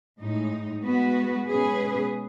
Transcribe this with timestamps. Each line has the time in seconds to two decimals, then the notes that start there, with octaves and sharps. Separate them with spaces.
0.19 A2 G#3 D#4
0.83 G#3 B3 F#4 B4
1.47 B2 G#3 C#4 G#4 B4